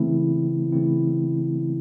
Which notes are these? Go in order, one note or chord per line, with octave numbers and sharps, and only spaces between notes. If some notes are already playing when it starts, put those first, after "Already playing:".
Already playing: C#3 E3 A3 C4 E4
C#3 E3 A3 C4 E4